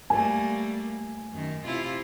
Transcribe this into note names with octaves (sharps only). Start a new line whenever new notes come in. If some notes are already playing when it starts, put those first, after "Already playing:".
G3 A3 A#3 G#5
F#2 D#3
C3 E4 F4